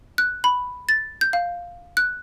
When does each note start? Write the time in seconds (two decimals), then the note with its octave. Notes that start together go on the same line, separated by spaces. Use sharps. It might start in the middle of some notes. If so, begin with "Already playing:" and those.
0.18 F#6
0.44 B5
0.89 A6
1.21 G6
1.33 F5
1.97 F#6